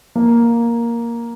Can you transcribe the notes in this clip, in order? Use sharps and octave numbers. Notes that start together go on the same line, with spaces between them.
A#3